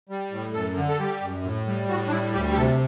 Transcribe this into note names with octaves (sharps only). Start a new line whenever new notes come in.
G3
A2
F#2 A4
D3
A4
G3 G4
F#2
A2
G3
A2 F#4
D4
G3 E4
D2 G4
G4
C3 A4